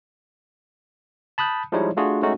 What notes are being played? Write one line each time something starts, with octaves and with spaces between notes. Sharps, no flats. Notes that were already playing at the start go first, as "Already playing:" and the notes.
A5 B5 D#6 F#6 G6
F3 G3 G#3 D#4 E4 C#5
A3 D4 F4 F#4 G#4
G#3 A3 C#4 D#4 F#4